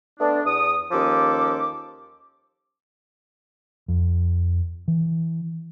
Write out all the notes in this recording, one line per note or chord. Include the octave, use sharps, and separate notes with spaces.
A3 B3 D4
E2 D#6
D#2 F3 C#4 A4 D6
F2
E3